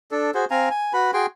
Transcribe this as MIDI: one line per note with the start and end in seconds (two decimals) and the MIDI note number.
0.11 0.31 62
0.11 0.31 69
0.34 0.45 66
0.34 0.45 68
0.34 0.45 72
0.51 0.69 60
0.51 0.69 77
0.51 0.69 80
0.51 0.69 82
0.70 0.93 80
0.93 1.11 66
0.93 1.11 71
0.93 1.11 83
1.14 1.26 66
1.14 1.26 68
1.14 1.26 79
1.14 1.26 84